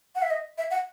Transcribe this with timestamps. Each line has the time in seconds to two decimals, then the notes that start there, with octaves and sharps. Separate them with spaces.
0.15 F#5
0.22 E5
0.30 D#5
0.58 E5
0.71 F#5